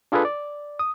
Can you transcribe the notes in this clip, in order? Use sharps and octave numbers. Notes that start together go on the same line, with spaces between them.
D4 F4 G#4 A4 B4
D5
D#6